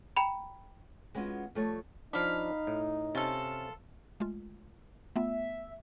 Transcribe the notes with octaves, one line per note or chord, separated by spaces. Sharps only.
G5 A#5 B5
G#3 B3 C#4 D#4 F4 F#4
F3 G3 A3 C#5 D5 A5
F3 D4 D#4 F5 B5
A2
C3 C#4 F4 A4
G#3 A3 F4
A3 B3 F4 E5